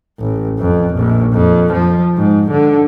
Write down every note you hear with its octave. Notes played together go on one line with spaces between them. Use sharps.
A1
F2
A#1
F2
F3
G#2
D3